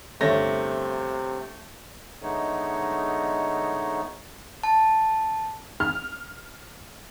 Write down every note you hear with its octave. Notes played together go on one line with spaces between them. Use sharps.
G1 C3 A3 C#5 A#6
D3 G#3 A3 B3 D#4 C#5
A5
F6